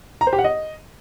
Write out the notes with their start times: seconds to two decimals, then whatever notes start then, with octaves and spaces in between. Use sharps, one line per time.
0.21 A#5
0.27 C5
0.33 G4
0.39 F#5
0.44 D#5